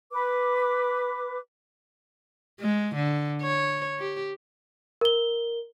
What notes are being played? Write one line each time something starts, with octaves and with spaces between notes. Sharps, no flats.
B4 D6
G#3
D3
C#5
G4
A#4 G7